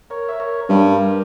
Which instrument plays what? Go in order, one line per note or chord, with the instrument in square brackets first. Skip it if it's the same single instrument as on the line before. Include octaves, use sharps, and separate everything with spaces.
[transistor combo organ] A#4 C#5
E5
A#4 C#5
[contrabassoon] G2 [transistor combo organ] G4 A#4